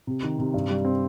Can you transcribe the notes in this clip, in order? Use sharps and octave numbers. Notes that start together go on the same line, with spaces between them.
C3
D#3
C3
G2
G3
C4